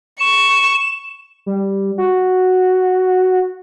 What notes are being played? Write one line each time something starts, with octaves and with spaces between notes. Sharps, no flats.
C#6 E7
G3
F#4